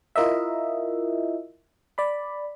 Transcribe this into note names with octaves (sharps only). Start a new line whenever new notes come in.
E4 F4 A#4 D#5 E5
D5 B5